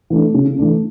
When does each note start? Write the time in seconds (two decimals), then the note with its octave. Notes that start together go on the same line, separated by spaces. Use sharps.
0.10 E3 A3 D4
0.34 C#3
0.58 E3 A3 D4